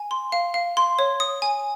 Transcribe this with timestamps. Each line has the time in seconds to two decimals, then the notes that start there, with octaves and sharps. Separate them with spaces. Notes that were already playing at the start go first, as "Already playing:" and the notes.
Already playing: G#5
0.11 C6
0.32 F5
0.54 F5
0.77 C6
0.99 C#5
1.20 D#6
1.42 G#5